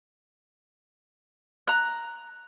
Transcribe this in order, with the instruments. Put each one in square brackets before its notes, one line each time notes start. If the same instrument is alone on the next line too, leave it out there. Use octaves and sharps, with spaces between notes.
[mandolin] A#5 F#6